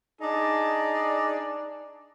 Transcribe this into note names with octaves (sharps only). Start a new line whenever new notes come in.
D4 D#4 G#4 D5